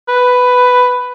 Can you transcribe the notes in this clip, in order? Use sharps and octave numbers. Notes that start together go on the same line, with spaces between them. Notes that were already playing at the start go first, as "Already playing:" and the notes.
B4